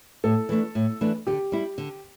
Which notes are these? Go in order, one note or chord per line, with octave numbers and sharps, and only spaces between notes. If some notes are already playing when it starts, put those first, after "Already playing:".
A2 A4
E3 A3 D4
A2
E3 A3 D4
D3 G4
G3 E4
D3